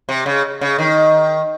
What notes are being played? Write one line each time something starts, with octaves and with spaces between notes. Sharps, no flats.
C3
C#3
C#3
D#3